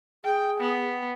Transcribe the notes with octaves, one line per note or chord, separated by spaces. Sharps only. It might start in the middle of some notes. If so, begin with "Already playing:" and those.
G#4 G5
B3